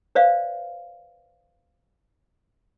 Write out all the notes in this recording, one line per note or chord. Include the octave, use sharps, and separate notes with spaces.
B4 C5 D5 E5 F5